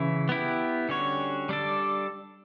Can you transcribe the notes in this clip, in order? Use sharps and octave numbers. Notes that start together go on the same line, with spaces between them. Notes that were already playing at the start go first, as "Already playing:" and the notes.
Already playing: C#3 E3 E4
B3 E4 G4
D3 G3 C#4 F#4 C#5
G3 D4 A4 D5